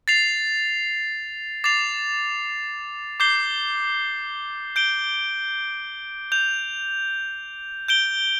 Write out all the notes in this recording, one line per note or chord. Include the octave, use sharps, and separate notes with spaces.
A6 C7 F7
D6 A6 C7 F7
D6 G6 C7 G7
G6 D7 G7
G6 F7
G6 D7 G7